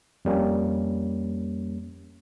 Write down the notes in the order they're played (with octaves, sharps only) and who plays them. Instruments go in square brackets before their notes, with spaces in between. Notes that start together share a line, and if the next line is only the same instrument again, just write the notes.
[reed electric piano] F2 G3 A#3 C#4